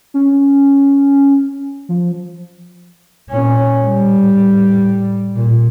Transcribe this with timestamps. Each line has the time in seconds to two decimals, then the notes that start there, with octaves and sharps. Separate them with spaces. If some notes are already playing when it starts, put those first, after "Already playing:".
0.14 C#4
1.89 F3
3.30 A#2 C#4
3.85 A2 G3
5.36 A#2